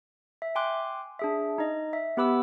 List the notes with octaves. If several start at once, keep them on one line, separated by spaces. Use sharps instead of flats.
E5
G5 G#5 C6 D6 F#6
D4 G#4 E5
D#4 D#5
E5
B3 G4 B4 B5 D6 E6